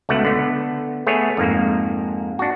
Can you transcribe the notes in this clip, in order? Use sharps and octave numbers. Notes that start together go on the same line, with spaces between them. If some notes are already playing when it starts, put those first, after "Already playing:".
C#2 B2 A3 F#5
D3 B3
A3 B3 G#4 C#5
F2 G#2 A#3
D4 F#4